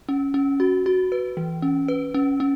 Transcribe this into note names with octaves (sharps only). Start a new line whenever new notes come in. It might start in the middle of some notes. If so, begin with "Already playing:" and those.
C#4
C#4
F#4
F#4
B4
E3
C#4
B4
C#4
C#4